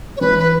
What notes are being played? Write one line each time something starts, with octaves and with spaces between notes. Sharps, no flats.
C#5
E3 B4
B4